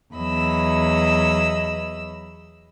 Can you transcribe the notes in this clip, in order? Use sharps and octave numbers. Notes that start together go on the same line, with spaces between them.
E2 F#3 D#5 B5 E6